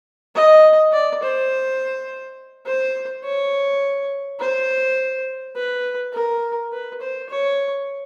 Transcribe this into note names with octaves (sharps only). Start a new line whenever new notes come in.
D#5
D5
C5
C5
C#5
C5
B4
A#4
B4
C5
C#5